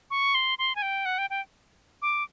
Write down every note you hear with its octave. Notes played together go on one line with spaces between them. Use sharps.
C#6
C6
C6
G#5
G5
F#5
G5
G5
D6